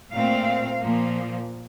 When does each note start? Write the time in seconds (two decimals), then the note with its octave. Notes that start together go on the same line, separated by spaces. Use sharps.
0.12 A#2 A3 C4 F5
0.80 A#2 F3 A#3